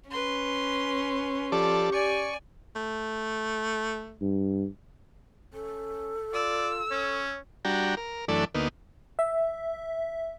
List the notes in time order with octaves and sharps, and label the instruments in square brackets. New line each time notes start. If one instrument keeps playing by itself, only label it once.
[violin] C#4 [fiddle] B4 C6
[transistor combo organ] F3 A4 D5 [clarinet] G4
[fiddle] D5 G#5 [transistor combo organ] C#6
[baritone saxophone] A3
[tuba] G2
[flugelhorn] C#4 [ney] A4
[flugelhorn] F4 [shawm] D5 [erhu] E6
[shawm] C#4 [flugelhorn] C#5
[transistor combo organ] G3 D4 F#4 G5 A#5
A#4
F#2 E3 A3 D4 A4 D5
D2 A#3 B3 D#4
[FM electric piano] E5